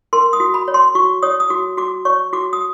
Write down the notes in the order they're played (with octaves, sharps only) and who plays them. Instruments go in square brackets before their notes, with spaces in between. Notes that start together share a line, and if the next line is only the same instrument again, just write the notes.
[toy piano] A#4 C6
D#6
F#4
B5
C#5
C6
F#4 C#6
C#5 D#6
D#6
F#4 D6
F#4 D6
C#5 C#6
F#4 D6
D#6